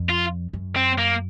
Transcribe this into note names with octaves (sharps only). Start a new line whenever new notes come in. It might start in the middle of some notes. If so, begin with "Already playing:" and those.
Already playing: F2
F4
F#2
C4
A#3